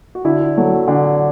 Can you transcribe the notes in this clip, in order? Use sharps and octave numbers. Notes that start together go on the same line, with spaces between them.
F#4
D3 E4
F#3 A3
D3